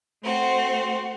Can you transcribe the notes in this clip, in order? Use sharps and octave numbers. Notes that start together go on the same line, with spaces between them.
A3 C4 F#4